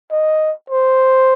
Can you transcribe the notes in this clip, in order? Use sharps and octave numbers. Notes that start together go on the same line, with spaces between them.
D#5
C5